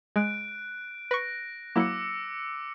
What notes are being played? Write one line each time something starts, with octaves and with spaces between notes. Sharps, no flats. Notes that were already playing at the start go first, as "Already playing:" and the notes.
G#3 F#6 D7
B4 C#6 A#6
F#3 A#3 E4 D6 E6 C#7